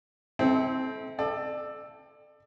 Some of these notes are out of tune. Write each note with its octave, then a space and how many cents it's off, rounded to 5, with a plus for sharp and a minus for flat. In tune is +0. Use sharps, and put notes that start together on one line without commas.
C4 +0 E4 -40 A4 -35
A4 +0 D5 +30